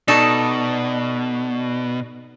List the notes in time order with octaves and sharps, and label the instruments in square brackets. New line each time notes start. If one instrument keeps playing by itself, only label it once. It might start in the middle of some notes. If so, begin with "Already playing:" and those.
[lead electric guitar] B2 [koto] D#4 A4 [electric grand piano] D5 C#6 D#6